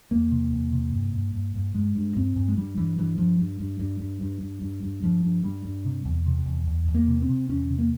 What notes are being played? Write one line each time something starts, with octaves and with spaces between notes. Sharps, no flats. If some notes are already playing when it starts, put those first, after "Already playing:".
E2 A#3
C3
E2
C3
G2
G2
G2
G2
G2 G#3
G2
G2 C4
G2
G#3
G2 G3
G2 E3
G2 E3
G2 F3
G2
G2
G2
G2
G2
G2
G2
G2
G2 F3
G2
G2 G3
G2
C3
E2
C3
E2
E2
E2
A#3
C3
C4
C3
E2 C#4
C3
A#3